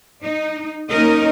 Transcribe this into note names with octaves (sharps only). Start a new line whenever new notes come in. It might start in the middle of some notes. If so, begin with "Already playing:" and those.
D#4
A#3 C#4 D#4 A#4 D#5